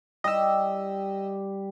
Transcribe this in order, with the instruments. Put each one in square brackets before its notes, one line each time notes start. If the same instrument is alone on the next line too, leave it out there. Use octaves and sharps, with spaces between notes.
[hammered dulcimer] G3 G4 [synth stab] D#5 E6